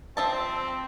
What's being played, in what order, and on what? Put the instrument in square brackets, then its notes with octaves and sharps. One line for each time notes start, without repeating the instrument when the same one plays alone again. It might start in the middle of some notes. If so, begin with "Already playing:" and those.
[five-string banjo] F3 E5 A5 [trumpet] C4